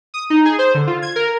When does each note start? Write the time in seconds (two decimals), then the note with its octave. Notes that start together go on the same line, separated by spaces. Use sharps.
0.14 D#6
0.30 D#4
0.45 G#4
0.59 C5
0.75 D3
0.87 F4
1.02 G#6
1.16 A#4